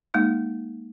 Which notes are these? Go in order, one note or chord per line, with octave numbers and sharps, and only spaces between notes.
G#3 A#3 D#4 E5